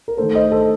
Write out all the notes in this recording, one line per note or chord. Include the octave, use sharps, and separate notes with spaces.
A#4
D#3 A3 D4 A4 C5
C5 D#5
A4 C5